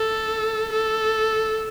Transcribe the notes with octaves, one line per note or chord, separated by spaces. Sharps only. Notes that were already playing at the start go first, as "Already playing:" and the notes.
Already playing: A4
A4